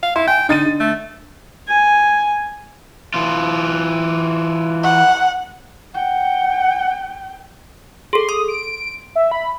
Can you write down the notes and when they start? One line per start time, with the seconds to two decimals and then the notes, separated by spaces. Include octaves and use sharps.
0.03 F5
0.16 E4 C6
0.27 G5 G#5
0.49 D3 D#4 A6 D#7
0.66 D3
0.80 A3
1.68 G#5
3.14 E3 F4
4.84 F#5
5.95 F#5 G5
8.13 G#4 A4 C6
8.29 C6 D#6
8.48 D7
9.15 E5
9.32 B5